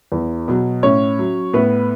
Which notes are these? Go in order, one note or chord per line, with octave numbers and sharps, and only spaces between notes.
E2
B2 F#3
A2 C#4 C#5
F#3
A2 B3 B4